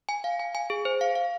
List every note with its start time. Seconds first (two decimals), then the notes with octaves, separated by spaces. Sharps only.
0.09 G#5
0.24 F5
0.40 G#5
0.55 G#5
0.70 G#4
0.85 C5
1.01 F5
1.15 F5